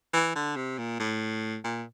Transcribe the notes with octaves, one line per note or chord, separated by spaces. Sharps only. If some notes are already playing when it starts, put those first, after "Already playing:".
E3
D3
C3
A#2
A2
A#2